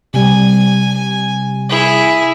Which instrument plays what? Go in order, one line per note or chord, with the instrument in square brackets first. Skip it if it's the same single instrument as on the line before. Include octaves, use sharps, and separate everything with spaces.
[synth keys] C3 G3 [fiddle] G#5
[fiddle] E4 G#4